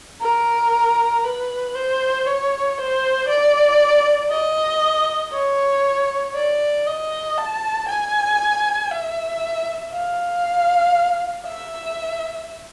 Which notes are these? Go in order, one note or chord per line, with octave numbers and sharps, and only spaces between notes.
A#4
B4
C5
C#5
C5
D5
D#5
C#5
D5
D#5
A5
G#5
E5
F5
E5